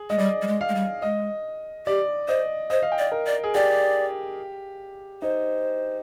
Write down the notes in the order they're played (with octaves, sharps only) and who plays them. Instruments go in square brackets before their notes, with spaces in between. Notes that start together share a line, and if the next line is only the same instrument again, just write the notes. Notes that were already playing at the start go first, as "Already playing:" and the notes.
Already playing: [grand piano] G#4
[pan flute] G#3 [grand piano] D#5
[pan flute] G3 [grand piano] D5
[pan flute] G3
G#3
[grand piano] F5
[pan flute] G#3
G3
[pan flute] G#3 [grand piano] D#5
[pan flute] G4 [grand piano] D5
[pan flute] C5 [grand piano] D#5
[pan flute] C5 [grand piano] D#5
[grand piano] F5
G5
[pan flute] D5
[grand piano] A#4
[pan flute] D5
[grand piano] G#4
[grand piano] G4 [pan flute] D5
[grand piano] D#4 [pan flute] C5